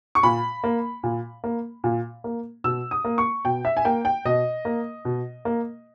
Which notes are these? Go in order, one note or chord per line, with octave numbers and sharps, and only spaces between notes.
C#6
A#2 B5
A#3
A#2
A#3
A#2
A#3
B2 E6
D#6
A#3
C#6
B2 G5
E5
G#5
A#3 G5
G5
B2 D#5
A#3
B2
A#3